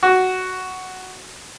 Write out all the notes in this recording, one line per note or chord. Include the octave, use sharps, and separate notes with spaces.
F#4